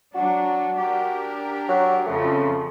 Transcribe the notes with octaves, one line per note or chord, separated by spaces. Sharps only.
F#3 D4 F#4
D4 G4 A#4
F#3
F2 C#3 F3 A3